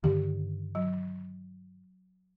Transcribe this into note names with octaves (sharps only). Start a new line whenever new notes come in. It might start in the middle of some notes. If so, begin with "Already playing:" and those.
G2 D3 D#3 G4
F#3